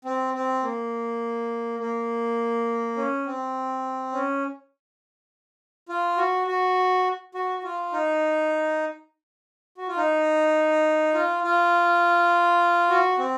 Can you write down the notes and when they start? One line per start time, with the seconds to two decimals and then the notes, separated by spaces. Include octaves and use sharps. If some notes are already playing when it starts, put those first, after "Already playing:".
0.05 C4
0.34 C4
0.63 A#3
1.79 A#3
2.96 C#4
3.26 C4
4.13 C#4
5.89 F4
6.17 F#4
6.47 F#4
7.35 F#4
7.59 F#4
7.64 F4
7.93 D#4
9.78 F#4
9.88 F4
9.97 D#4
11.14 F4
11.44 F4
12.90 F#4
13.19 C4